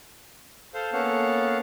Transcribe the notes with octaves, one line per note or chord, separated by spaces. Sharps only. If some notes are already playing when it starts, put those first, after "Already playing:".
A4 C5 F5
A#3 B3 C#4 A4 F5 F#5